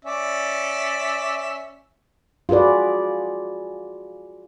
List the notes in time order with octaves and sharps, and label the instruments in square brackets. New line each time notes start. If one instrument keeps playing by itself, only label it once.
[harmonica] C#4 D5 E5
[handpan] F4 F#4 G#4 B4 D5